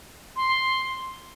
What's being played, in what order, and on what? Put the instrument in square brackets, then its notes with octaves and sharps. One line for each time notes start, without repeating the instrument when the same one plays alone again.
[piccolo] C6